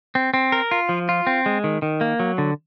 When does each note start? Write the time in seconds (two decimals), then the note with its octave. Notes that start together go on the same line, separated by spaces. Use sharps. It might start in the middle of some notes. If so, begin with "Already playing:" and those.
0.15 C4
0.34 C4
0.52 A#4
0.71 F4
0.89 F3
1.09 F4
1.27 C4
1.46 G#3
1.64 D#3
1.82 D#3
2.01 A#3
2.20 F#3
2.38 D3